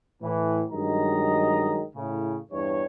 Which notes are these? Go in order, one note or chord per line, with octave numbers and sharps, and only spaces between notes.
A2 E3
G2 D#3 F#3 G#3 D#5 A#5
A2 C#3
E2 G2 C#5